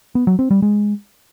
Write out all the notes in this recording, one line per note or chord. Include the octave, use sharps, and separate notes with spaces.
B3
F#3
C4
G3
G#3